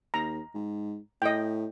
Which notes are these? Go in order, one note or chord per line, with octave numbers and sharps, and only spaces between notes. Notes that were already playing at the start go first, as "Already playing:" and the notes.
D#2 A#5
G#2
A2 D#5 G5